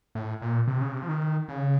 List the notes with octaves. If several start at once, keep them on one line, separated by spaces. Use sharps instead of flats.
A2
A#2
C3
C#3
C3
F3
D#3
C#3